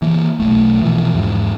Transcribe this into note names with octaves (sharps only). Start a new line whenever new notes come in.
E3 A#3
B1 E2 A3
B2 E3 F3
E2 G#2